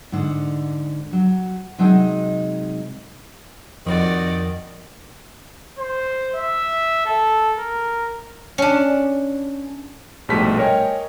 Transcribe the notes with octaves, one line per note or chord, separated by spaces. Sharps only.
G#2 D3
F#3
C3 F#3 G#3 D#4 D#5
F2 D#3 F#4 D5
C5
E5
A4
A#4
C#4 D4
A#1 G#2 B2 G3 A3 B6
A#4 C#5 D#5 G5 G#5